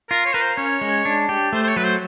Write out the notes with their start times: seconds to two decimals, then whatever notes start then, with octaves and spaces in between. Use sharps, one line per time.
0.10 F4 A#4
0.25 C#5
0.34 A#4 B4
0.41 C5
0.57 C#4 C#5
0.81 G#3
1.05 D4
1.29 G4
1.53 A3 C5
1.63 C5
1.69 C#5
1.76 F#3 B4
1.84 C5